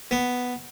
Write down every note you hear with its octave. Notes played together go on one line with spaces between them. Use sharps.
B3